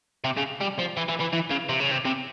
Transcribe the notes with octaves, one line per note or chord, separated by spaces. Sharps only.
C3
C#3
G3
F3
E3
E3
E3
E3
C#3
C3
C#3
C3
C3